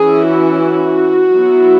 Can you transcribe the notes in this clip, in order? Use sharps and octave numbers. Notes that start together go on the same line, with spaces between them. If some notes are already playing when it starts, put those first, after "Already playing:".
Already playing: E3 C#4 E4 G#4
F#4
F#4
F#3 B3 E4